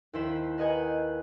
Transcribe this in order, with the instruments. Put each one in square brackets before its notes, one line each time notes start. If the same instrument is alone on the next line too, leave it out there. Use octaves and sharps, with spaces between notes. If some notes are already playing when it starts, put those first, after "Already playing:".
[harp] D#2 E4 C5 B6 E7
A#4 B4 D#5 F#5 G#5 G6